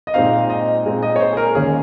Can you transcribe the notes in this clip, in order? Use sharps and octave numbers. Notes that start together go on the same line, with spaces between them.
D#5
A#2 G#3 C4 D#4 F5
D#5
A#2 G#3 C4 D#4
D#5
C#5
C5
G#4
A#4
D#2 D#3 A#3 C#4 G#4